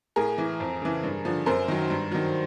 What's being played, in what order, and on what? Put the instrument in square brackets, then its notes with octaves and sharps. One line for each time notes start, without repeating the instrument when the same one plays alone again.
[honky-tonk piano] A2 G#4 A#4
E3
F2
C#3 E3
G2
D3 F3
F#2 A#4 C5
D#3 F#3
G2
D#3 F#3